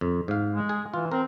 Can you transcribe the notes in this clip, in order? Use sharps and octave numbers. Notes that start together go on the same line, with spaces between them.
F2
G#2 F5
G#3
G#4
E3 F4
C4 A#4